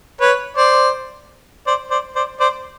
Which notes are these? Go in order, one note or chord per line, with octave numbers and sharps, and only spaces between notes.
B4 C#5
C5 D5
C5 D5
C5 D5
C5 D5
C5 D5